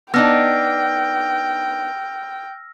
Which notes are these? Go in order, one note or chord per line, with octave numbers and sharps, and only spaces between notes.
B3 D4 D#4 G5 E6 F6 A#6